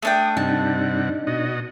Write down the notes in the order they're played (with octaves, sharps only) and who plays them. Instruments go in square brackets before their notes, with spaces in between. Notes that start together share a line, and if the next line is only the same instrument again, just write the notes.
[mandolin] A3 D4 G5 [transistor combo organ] D#6
[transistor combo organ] G2 C3 F#5 [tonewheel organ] D4 D#4 [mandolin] A5
[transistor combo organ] B2 F#4 D#5